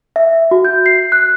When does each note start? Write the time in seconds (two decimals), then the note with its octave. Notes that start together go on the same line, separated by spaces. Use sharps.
0.16 E5
0.51 F#4
0.65 G6
0.86 C7
1.12 F#6